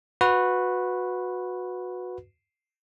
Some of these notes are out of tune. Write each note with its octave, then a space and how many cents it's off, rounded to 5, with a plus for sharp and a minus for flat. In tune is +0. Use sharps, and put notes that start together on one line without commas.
F#4 -20 B4 +0